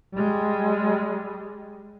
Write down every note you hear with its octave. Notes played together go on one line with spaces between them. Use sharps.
G3 G#3